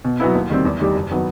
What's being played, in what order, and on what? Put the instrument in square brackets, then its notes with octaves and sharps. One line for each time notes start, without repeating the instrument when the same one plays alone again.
[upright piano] B2
F#3 B3 E4
D#2
D#3 G3 C4
E2
D#3 G3 D#4 G4
F#1
D#3 F#3 B3